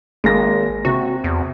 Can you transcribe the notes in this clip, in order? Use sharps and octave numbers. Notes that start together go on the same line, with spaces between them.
G#1 G#3 A#3 A#6
C3 F#4
E2